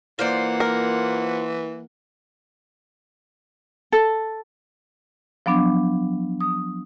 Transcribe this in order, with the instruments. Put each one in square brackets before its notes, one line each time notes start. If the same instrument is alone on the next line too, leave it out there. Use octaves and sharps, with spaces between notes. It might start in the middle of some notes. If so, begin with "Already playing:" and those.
[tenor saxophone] E3 [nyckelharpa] A#3 F#5 [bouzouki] F4 C5 D5
[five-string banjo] A#4
[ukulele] A4
[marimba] F3 F#3 B3 D4
D#6